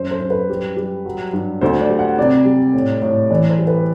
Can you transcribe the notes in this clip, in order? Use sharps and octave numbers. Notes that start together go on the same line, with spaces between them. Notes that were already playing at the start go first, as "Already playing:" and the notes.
Already playing: F#2 C5
C5
F#2
B4
G3
G3
F#3
G2
D2 C5
D5
G3
F#5
C3 D5
G3
A2
A2
E3 D5
C5
G3
B4